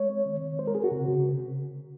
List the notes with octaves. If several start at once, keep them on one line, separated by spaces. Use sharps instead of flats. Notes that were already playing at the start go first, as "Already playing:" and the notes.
Already playing: G#3 C#5
C4
D#3
D#3
G#3 C5
A#4
C4 G#4
F#4
C#3
C#3